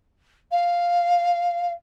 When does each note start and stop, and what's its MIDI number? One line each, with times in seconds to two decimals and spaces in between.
0.51 1.72 77